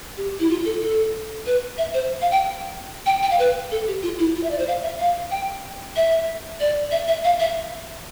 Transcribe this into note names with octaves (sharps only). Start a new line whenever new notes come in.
G4
E4
F4
A4
A4
B4
E5
C5
F5
G5
G5
G5
F5
B4
A4
G4
F4
E4
F4
E5
D5
C5
F5
E5
F5
G5
E5
D5
E5
E5
F5
E5